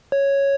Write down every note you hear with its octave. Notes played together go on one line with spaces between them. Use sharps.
C#5